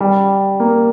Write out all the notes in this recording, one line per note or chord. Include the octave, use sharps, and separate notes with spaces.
G3
A#3